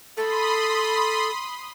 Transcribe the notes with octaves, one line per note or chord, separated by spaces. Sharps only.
A4 B5 C6 D#6